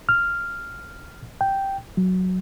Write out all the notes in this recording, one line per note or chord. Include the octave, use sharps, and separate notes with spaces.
F6
G5
F#3